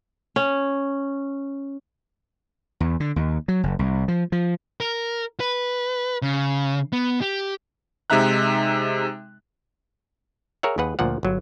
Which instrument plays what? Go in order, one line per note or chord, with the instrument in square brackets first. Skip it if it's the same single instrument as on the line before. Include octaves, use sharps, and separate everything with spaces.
[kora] C#4
[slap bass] E2
D3
D#2
F#3
F#1
C2
F3
F3
[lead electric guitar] A#4
B4
C#3
B3
G4
[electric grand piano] C3 G#3 D#4 E5 A#5 F#6
[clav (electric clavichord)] G#4 A#4 C#5 E5 F#5
D#2 G#4 B4 F#5
D2 A#2 F3 F#5
G1 F#3